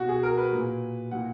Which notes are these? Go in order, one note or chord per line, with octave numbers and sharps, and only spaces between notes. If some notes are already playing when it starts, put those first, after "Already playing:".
Already playing: B2 F#4
G#4
A#4
B4
A#2
A#2 F#5